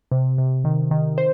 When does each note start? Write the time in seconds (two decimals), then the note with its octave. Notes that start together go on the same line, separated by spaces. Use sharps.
0.11 C3
0.38 C3
0.64 D#3
0.91 D#3
1.18 C5